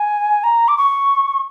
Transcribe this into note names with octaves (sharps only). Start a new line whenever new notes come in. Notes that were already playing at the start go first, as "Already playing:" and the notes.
Already playing: G#5
A#5
D6
C#6